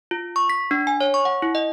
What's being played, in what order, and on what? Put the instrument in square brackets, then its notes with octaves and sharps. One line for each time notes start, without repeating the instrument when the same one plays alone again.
[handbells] F4
C#6
B6
D4
G#5
C#5
C#6
F#5
E4
D#5